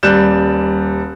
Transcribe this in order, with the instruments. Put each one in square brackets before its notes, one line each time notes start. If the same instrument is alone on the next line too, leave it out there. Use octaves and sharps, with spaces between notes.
[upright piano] D#1 G3 D5 F#6 G6 E7